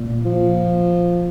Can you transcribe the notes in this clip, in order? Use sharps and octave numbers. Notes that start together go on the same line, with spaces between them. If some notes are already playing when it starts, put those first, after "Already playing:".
Already playing: A#2
F3